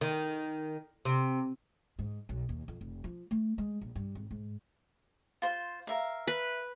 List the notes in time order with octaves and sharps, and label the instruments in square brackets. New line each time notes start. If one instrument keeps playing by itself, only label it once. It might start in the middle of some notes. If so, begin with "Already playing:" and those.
[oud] D#3
C3
[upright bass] G#2
B1
D#2
F2
F1
F3
A3
G#3
A#1
G2
G#1
G#2
[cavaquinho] F4 C5
A#4 E5 F5
[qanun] B4